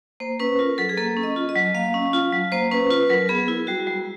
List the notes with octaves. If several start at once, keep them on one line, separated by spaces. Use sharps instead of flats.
A#3 C5
C#4 B4
F4 A#4
F#3 A4
G#4
A#3 A4
C#4
D#5
F4
D#5
F#3
A#3 F5
C#4
F4
F#3
A#3 C5
C#4 B4
F4 B4
F#3 A#4
B3 G#4
E4
G3 F#4
G3